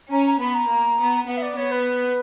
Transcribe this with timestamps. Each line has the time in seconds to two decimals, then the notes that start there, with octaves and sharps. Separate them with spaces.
0.11 C#4 A#5
0.26 A#5
0.40 B3 B5
0.54 A#5
0.70 A#3
0.98 B3
1.28 B3 F#5
1.37 E5
1.42 D5
1.57 B3 C#5
1.71 B4